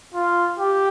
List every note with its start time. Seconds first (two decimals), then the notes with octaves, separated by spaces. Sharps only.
0.14 F4
0.59 G4